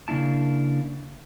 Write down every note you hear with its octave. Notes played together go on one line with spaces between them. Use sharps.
C#3 A#3 D4 E4 A5